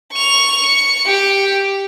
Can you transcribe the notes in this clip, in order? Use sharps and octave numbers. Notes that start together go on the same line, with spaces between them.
C#6 F7
C#7
G4